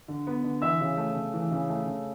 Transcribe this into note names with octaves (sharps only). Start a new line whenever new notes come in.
D3
B3
D3
E3 E5 E6
C#3
A3
C#3
E3
C#3
A3
C#3